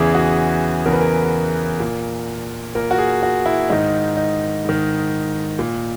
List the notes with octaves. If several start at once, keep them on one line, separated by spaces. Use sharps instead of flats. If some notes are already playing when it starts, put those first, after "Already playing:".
Already playing: E2 C#3 E3 G#4
F#4
E2 C#3 E3 A#4
B4
A#4
A#2
A#2 A#4
F#4
G#4
F#4
E4
G#2 D#3 D#4
D#4
G#2 D#3
A#2